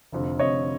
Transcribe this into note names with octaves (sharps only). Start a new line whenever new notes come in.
F1 F2 D3
F1 F2 D3 C#5 D#5